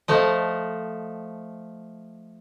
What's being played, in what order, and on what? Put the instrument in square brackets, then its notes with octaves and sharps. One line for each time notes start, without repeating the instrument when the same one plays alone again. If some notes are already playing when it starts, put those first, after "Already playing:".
[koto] F3 A3 D#5